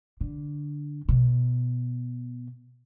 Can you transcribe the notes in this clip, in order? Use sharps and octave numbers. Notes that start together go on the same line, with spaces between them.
D3
B2